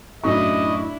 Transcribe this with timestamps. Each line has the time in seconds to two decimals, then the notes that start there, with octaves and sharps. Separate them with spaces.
0.24 F#2 A2 D4 E4 D#5 C#6